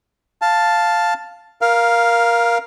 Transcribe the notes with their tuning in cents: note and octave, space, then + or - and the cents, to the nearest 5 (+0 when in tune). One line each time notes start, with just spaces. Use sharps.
F5 +0 A5 +0
A#4 +15 F5 +0